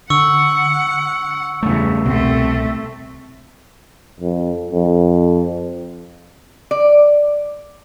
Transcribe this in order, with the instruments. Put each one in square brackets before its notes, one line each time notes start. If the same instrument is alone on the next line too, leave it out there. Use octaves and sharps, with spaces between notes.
[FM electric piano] D3 [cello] F#5 [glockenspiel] C#6 E6
[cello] E2 G2 [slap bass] C#3 A3
[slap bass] C2 [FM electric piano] B2 [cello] A3 C4
[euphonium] F2
F2
[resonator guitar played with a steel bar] D5